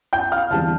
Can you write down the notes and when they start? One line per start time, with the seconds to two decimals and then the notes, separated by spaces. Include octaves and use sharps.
0.13 G5 G6
0.32 F5 F6
0.50 E2 D3 G3 C4 A5